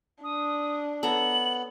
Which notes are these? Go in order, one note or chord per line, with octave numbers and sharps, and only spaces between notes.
D4 D#6
B3 A4 C#5 A#5 F#7